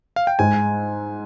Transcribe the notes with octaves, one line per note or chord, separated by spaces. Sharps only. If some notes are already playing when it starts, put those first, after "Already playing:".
F5
G5
G#2 G#5